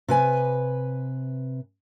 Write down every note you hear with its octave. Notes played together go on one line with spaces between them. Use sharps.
C3 B4 G#5